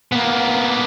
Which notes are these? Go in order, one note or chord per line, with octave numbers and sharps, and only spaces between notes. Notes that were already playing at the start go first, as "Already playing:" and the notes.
A#3 B3